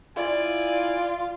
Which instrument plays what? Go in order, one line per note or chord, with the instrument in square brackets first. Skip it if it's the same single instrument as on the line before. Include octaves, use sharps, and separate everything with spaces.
[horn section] E4 G#5 [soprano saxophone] F4 [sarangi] D5